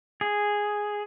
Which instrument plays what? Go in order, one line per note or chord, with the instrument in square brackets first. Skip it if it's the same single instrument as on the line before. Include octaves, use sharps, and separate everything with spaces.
[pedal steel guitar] G#4